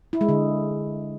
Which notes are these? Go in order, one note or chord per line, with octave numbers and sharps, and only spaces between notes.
E4
G#3
D3